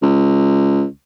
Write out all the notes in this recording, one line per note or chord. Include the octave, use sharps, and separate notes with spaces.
C#2